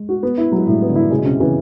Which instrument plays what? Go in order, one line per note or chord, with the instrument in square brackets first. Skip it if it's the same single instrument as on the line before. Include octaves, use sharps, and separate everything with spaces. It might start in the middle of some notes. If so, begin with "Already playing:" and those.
Already playing: [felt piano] G#3
[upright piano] F#4
B3
E4
[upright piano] F#3 [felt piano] G#3
[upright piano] A2 [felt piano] G3
[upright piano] B3
[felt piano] D3
[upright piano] E4
[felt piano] C#3 [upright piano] G#3
[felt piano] B2
[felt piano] C3 [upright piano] C#4
[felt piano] C#3 [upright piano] E3